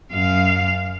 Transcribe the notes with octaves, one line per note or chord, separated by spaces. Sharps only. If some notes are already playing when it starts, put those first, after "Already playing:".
F#2 F5